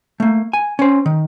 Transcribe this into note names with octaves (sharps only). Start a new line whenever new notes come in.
A3 A#3
G#5
C#4 C5
D#3